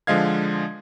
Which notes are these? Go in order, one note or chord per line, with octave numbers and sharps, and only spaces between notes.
D3 F3 G#3 D#5 F5 G#6